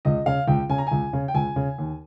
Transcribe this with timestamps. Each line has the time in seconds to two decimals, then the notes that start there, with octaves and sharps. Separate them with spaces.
0.05 C#2 D#5
0.26 C#3 F5
0.48 C#2 G5
0.70 C#3 G#5
0.78 A#5
0.87 C#2 G#5
1.13 C#3
1.28 G5
1.34 C#2 G#5
1.56 C#3
1.79 D#2